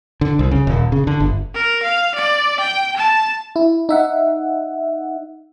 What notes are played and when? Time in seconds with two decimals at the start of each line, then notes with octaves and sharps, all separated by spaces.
0.21 D3
0.39 C2
0.51 C#3
0.67 D#1
0.92 C#3
1.07 D3
1.20 G1
1.54 A#4
1.83 F5
2.15 D5
2.60 G5
2.97 A5
3.56 E4
3.89 D#4 E5 F#5